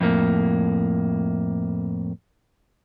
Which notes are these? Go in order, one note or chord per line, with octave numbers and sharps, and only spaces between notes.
F2 A2 A#3